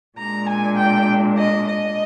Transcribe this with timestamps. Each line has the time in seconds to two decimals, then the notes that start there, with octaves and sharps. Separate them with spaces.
0.18 A#2 G#3 D4 A#5
0.48 G#5
0.78 G5
1.37 D#5
1.66 D#5